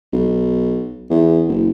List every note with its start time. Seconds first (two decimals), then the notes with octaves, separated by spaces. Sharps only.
0.13 B1
1.10 E2
1.48 F#1